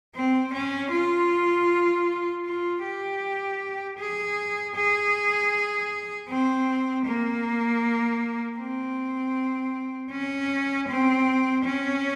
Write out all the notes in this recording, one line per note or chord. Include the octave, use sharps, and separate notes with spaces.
C4
C#4
F4
F4
G4
G#4
G#4
C4
A#3
C4
C#4
C4
C#4